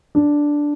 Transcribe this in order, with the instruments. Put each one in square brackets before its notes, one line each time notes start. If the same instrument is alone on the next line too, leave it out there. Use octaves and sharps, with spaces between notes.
[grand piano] D4